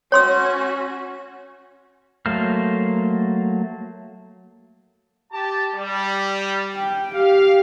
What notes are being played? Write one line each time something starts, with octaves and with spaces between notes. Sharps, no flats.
C#4 F#4 C#5 C6 E6
F#3 A3 A#3 C5 F6
G4 A5
G3
G5
G4 F5